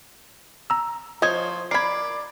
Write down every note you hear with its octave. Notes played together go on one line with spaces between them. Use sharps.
A#5 E6
F3 C5 C#5 D#5 D#6 G#6
A#4 D5 B5 G#6 C7